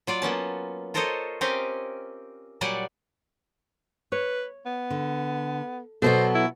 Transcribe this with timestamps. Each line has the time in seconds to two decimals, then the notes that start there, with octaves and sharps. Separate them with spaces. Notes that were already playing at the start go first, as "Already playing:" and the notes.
0.07 F#3 F4 D5
0.22 A#3 B3 C#4 A5
0.94 F4 A4 A#4 C5 C#5 D#5
1.41 C4 C#4 G4 A#4 D#5 F5
2.61 A#2 F#3 G3 D5 F#5 G#5
4.12 B4 C#5
4.66 B3
4.90 D3
6.02 B2 F#3 B3 A4 C5 D#5
6.34 E4